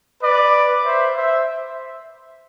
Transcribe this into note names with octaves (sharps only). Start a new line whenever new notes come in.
B4 D5
C5 E5
C5 E5